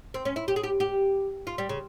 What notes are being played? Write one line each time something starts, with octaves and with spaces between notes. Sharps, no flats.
C4
C#4
E4
G4
G#4
G4
G4
F4
G3
C#3